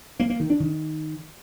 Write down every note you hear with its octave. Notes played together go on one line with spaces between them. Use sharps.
A#3
A#3
D#3
D4
D#3